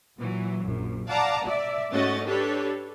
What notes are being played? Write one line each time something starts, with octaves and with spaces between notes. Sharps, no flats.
A#2 E3 F#3
A#1 F#2
D5 F5 F#5 A5 A#5 D6
D5 E5
G#2 A3 C#4 F#4 D#5 A6
D4 G4 A4 B4 C#5